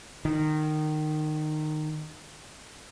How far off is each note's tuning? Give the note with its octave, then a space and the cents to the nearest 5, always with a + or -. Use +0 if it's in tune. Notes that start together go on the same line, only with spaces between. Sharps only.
D#3 -20